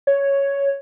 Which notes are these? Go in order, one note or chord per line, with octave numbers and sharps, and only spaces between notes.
C#5